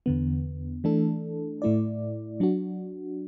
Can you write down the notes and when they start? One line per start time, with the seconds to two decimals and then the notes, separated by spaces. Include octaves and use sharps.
0.06 E2 D3 B3
0.84 E3 A3 D4 A4
1.62 A2 A3 E4 D5
2.40 F#3 D4 F#4